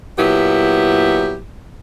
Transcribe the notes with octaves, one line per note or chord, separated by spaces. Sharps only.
A#2 F#3 B3 E4 G4